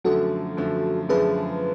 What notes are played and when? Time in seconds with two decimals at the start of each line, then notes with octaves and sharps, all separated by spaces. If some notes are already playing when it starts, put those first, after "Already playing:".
0.05 F#2 D3 F3 A3 F#4 A4
0.57 F#2 D3 F3 A3
1.09 F#2 D3 F3 A3 G#4 B4